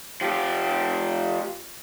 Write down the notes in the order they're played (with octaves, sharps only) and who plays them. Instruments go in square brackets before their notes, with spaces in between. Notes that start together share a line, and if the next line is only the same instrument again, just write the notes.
[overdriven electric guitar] F3 G4